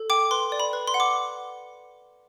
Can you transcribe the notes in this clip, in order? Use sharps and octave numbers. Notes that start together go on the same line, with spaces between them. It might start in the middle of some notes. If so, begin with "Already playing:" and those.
Already playing: A4
G5 D6
B4 C6
D5
B5
B4
C6
F#5
D6